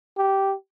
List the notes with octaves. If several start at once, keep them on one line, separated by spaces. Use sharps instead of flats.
G4